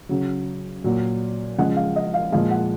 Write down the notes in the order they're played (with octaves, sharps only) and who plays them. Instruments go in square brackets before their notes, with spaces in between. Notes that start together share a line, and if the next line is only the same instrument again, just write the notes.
[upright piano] C#3 F#3
A#2 F#3
C#3 F3 G#3 F#5
F5
D#5
F5
A#2 F3 G#3 F5
F#5